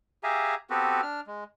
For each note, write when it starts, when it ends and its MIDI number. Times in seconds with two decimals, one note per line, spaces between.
0.23 0.55 67
0.23 0.55 68
0.23 0.55 76
0.23 0.55 77
0.23 0.55 80
0.23 0.55 82
0.70 1.01 59
0.70 1.01 60
0.70 1.01 66
0.70 1.01 67
0.70 1.01 69
0.70 1.01 71
1.03 1.21 62
1.03 1.21 89
1.27 1.44 56